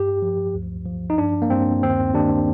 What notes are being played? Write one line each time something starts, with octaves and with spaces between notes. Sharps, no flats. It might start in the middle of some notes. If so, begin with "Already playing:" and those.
Already playing: G2 G4
F3
D2
F3
D#4
G2 D4
A#3
G2 C4
D#2 C4
D#2 D4